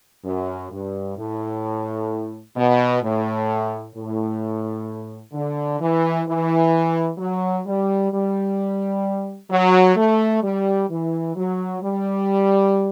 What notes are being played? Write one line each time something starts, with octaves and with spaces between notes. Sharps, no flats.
F#2
G2
A2
B2
A2
A2
D3
E3
E3
F#3
G3
G3
F#3
A3
G3
E3
F#3
G3